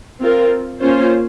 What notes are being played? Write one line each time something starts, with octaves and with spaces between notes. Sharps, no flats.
C4 F4 A#4
A#3 C#4 F4 C5